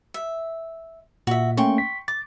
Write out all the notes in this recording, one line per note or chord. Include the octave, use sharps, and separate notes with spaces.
E5
A#2 F#4 E5
A3 A#3 C#4 G5 C6 C#6
B6
D6 A6